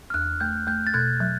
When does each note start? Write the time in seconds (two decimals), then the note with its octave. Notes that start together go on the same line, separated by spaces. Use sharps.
0.10 F6
0.14 E2 F#6
0.40 A3 G6
0.67 A3 G6
0.87 A6
0.94 B2 F#6 G#6
1.20 F#3